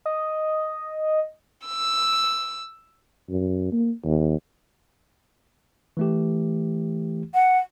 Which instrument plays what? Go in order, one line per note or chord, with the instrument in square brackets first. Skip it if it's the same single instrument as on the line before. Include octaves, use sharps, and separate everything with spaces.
[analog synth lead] D#5
[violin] E6
[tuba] F#2
A#3
D#2
[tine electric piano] E3 A3 G4
[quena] F#5